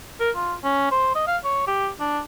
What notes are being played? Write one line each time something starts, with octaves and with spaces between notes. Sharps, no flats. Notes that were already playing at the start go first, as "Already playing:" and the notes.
A#4
F4
C#4
C5
D#5
F5
C#5
G4
D4